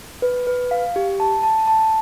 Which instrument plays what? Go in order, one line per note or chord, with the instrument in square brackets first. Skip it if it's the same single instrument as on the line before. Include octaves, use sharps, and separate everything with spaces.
[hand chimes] B4
B4
F5
G4
A5
A5
A5